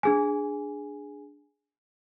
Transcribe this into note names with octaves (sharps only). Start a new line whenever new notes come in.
D4 G#4 G#5